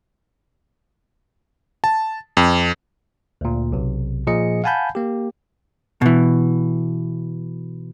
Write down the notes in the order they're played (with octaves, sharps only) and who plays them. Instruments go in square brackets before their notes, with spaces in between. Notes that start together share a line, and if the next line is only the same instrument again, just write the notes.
[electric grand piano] A5
F2
[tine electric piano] D2 A#2
B1 C3
A#2 F3 G#4 D#5 C#7
F5 F#5 G#5 A5 B5 G6
A#3 G4
[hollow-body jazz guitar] B2 E3